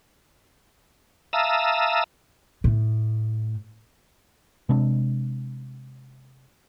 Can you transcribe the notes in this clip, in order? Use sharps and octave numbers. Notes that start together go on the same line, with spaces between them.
E5 F5 A5 A#5 D#6 E6
A2
C3 G#3 C4 D4